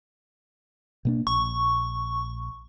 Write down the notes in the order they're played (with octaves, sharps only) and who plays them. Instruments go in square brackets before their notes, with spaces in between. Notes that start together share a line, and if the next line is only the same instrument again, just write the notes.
[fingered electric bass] B2 A#3 D4
[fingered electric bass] A#1 [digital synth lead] C#6